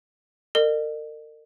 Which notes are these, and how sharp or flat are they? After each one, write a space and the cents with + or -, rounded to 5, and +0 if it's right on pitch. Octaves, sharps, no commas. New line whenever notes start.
A#4 -35 D#5 -45